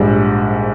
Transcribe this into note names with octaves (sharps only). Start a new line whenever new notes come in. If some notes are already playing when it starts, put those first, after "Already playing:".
Already playing: A#1 G#2 G3